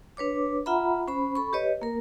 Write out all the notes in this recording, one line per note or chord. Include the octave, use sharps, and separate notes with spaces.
D4 B4 C#5 D6
F4 E5 F#5 A#5 B5
C#4 C5 B5
A4 B5 C#6
G4 B4 C#5 D#5
A#3 A#4